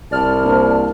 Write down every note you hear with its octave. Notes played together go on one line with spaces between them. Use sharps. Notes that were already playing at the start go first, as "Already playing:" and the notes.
C2 D5 A5 F6
A#3 D4 C5